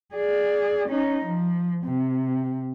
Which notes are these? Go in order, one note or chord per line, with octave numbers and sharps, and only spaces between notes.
G#4 D5
C#4 D#4
F3
C3